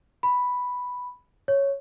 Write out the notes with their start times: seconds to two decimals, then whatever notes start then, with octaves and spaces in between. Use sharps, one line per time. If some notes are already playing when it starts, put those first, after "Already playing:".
0.23 B5
1.48 C#5